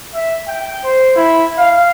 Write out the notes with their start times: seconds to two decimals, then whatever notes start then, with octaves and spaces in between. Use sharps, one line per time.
0.14 E5
0.47 G5
0.84 C5
1.16 E4
1.58 F5